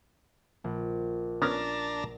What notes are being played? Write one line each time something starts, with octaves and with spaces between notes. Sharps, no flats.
A#1
B3 C#4 D4 A#4 A5 A#5